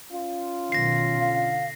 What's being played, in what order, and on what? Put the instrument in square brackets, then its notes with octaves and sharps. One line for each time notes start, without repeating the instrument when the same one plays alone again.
[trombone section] C#4 F4
[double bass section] B1 D#3 [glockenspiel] A#6 C7
[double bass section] D3 [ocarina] F5